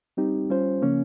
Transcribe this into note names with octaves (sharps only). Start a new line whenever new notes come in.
G3 C4 D#4 G4
G3 C#4 F4 C5
C#3 F3 A#3 C#4